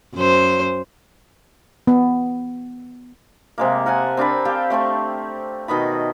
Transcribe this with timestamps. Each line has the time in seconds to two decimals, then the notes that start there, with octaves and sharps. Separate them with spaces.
0.15 F#2 C5
1.87 B3
3.58 C3 G#3 A#3
3.86 A#4 F#5 G#5 A5
4.17 C4 D4 A#4 B5
4.45 G4 F5 G5 A5
4.70 A3 C4 C6 C#6
5.68 B2 D#3 D#5 B5